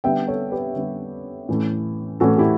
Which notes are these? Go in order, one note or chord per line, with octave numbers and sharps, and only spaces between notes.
D3 G3 B3 E5 G5
A4 C#5
G4 B4
D3 G3 B3
A2 E3 A3 C#4
A2 E3 A3 C#4 F#4 A4
E4 G4